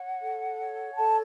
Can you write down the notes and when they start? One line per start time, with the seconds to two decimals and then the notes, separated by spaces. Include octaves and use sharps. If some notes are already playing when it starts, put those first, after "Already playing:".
Already playing: C#5 F#5
0.23 A4
0.60 C#5
0.92 G#5
0.97 A4 A5